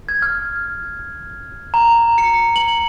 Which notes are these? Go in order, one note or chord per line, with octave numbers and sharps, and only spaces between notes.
G#6
F6
A#5
C#7
F#7